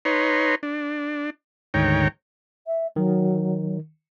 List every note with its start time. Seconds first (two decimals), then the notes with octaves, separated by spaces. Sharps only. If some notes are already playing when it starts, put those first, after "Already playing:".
0.05 D#4 B4 C#5 A#5 C6
0.63 D4
1.74 D2 G#2 D#3 C#5 G5 A#5
2.67 E5
2.96 D#3 F#3